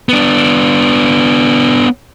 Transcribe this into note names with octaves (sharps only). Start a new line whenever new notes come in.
B3 D4